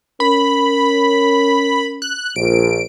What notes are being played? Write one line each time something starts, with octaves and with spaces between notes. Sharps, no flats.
C#4 A#4 B5
F#6
A#1 D7